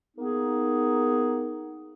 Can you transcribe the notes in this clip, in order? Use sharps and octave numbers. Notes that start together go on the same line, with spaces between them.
A#3 B3 D#4 G#4